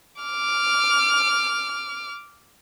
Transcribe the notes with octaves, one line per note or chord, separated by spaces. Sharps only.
D6 F6